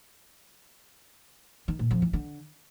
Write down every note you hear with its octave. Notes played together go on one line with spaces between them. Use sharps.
D#3
A#2
F2
E3
D3